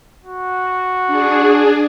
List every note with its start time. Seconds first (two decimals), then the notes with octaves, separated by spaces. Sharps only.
0.24 F#4
1.07 D4 G#4